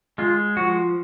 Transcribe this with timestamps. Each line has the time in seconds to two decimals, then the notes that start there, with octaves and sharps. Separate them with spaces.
0.18 G#3 F4
0.56 F3 F#4